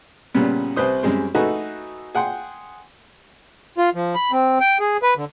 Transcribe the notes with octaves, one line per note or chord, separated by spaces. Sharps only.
A#2 C#3 G3 B3
C2 C3 B4 C5 D#6
F#2 G3 G#3 C4
A3 D#4 F#4 G#4 A4 B4
G#4 F#5 G5 C6
F4
F3
B5
C4
G5
G#4
B4
D3